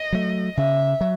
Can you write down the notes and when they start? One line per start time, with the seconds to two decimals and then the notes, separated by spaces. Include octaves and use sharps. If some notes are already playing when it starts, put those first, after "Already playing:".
Already playing: D#5
0.13 F#3 A3
0.57 C#3 E5
1.01 F#3